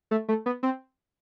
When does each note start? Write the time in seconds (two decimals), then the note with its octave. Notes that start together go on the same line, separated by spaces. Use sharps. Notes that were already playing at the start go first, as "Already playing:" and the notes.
0.11 A3
0.28 A3
0.46 B3
0.63 C4